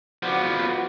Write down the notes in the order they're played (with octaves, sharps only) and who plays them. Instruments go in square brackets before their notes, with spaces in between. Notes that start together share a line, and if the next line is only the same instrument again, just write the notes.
[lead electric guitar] F3 B3 [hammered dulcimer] F#4 D5